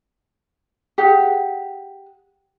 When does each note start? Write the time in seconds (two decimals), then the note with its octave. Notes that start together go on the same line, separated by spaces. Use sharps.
0.98 G4 G#4 F#5